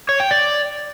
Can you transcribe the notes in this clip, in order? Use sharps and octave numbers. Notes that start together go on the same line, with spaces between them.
C#5
G5
D5